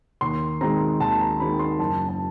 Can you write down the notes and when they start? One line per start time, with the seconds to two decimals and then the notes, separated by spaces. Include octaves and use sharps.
0.21 D#2 C6
0.61 D#3 G#3 C4 A#5
1.00 D#2 A5
1.21 A#5
1.40 D#3 G#3 C4 B5
1.59 C6
1.79 F#1 A5
2.08 A5